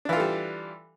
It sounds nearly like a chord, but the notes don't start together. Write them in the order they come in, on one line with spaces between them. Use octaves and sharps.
D4 E3 F4 A4 G3